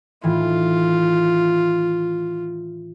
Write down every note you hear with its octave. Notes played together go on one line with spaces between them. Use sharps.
A2 D#3 E3 F4